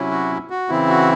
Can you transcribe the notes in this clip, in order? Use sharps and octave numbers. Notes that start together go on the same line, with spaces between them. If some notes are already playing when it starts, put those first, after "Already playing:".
Already playing: C3 F#3 C#4 E4
F#4
F#4
C#3 E3 C4 E4
F#4